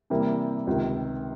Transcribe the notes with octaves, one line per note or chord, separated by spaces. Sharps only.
C3 E3 G3 A#3
C#2 C3 D#3